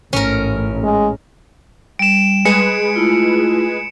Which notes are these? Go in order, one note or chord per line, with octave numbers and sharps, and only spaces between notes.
A1 G#2 C#4 A#4
G#3
G3 D7 E7
G#3 G#4 B4 C#7 E7
A3 E4 F4